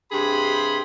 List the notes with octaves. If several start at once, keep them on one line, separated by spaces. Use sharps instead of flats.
G2 C3 G4 G#4 B5 C6